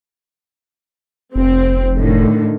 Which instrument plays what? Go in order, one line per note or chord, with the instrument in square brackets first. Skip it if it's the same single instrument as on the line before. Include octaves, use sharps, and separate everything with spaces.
[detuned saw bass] F1 [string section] C4
[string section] A2 D3 D#3